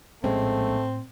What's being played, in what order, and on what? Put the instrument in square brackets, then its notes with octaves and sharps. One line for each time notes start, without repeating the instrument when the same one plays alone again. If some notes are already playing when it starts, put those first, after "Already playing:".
[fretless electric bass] A#1 G#3 C#4 [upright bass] A2 [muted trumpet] A3 [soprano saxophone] C4